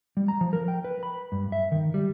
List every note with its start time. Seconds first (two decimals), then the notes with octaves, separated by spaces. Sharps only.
0.17 G3
0.28 A#5
0.41 F3
0.53 A#4
0.68 G5
0.84 B4
1.03 B5
1.32 G2
1.52 E5
1.72 D#3
1.94 G3